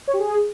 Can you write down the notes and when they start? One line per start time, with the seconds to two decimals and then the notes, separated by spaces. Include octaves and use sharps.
0.08 C#5
0.14 G4
0.19 G#4